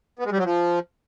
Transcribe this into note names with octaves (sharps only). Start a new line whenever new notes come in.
B3
G#3
G3
F#3
F3